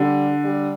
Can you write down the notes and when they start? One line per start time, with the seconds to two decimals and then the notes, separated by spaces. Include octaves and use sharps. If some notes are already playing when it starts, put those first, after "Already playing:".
Already playing: D3 G3
0.44 G3